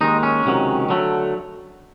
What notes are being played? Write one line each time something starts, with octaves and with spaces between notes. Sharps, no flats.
D#2 D#3 G#3 D#4
C#4
C#2 C3 D#3 F#3
D3 F#3 A3